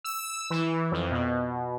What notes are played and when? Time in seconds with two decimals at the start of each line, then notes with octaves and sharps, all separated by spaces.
0.04 E6
0.50 E3
0.92 F2
1.12 B2